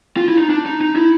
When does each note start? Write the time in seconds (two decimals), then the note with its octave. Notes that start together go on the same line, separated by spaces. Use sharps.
0.17 F4
0.28 E4
0.38 D#4
0.50 D4
0.66 D#4
0.81 D#4
0.96 E4